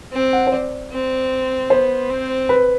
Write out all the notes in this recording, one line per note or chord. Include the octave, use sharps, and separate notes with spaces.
C4
F#5
C5
D5
C4
B3 C5
C4
B4